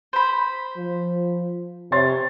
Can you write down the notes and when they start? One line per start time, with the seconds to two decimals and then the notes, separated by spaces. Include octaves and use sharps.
0.13 C5 B5
0.77 F3
1.92 C3 C#5 C6 A6